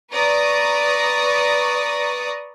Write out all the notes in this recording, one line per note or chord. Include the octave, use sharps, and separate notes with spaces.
B4 D5 A#5 C#6 D#6 A#6